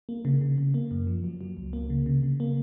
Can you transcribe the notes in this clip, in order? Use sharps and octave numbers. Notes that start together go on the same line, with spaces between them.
A#3
C#3
C#3
C#3
A#3
F#2
F3
F#3
F#3
C#2
A#3
C#3
C#3
C#3
A#3